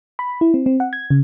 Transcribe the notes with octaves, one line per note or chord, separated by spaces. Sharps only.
B5
E4
C4
C4
F#5
G#6
C#3